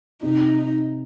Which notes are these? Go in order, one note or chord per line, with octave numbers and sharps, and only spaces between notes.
C3 D#4